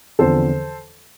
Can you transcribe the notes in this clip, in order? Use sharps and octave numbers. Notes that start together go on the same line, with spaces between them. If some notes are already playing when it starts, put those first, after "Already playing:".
E2 D3 F3 C4 A4 C5